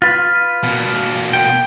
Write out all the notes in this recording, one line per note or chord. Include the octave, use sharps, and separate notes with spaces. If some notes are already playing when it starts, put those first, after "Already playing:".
F4 B4
B2 A#3
G5